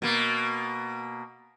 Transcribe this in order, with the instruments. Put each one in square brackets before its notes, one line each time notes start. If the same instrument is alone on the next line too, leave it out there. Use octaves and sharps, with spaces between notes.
[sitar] B2 A#3